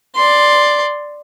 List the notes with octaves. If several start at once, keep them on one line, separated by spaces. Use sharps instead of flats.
D5 C6